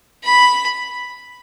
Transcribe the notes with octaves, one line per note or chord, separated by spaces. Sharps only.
B5